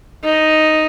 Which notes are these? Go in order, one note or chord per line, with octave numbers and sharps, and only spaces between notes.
D#4